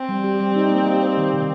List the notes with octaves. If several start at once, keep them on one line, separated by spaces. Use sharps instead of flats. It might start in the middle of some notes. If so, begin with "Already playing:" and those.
Already playing: C4
G3
G4
G3
D#4
A#3
G4
C5
D#3
C3